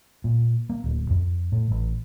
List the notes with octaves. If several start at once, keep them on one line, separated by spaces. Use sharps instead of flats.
A#2
A#3
D1
F2
A2
A1